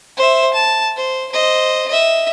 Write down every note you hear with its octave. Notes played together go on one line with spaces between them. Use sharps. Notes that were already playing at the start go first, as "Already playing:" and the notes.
C5 E5
A5
C5
C5 D#5
D#5 E5